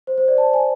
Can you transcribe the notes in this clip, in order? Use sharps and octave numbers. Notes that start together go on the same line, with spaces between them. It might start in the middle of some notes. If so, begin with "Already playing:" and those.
C5
C5
D5
A5
G#5